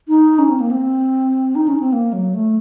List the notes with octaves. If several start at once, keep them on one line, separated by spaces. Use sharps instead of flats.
D#4
C#4
C4
A#3
C4
D#4
C#4
C4
A#3
F#3
A3